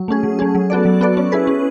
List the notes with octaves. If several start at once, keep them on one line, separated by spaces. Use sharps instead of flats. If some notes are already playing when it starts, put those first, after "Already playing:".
Already playing: F#3
A3 C#4 G#4
F#3
A3 C#4 G#4
F#3
B3 F#4 A4 D5
F#3
B3 F#4 A4 D5
C#4
E4 G#4 B4
C#4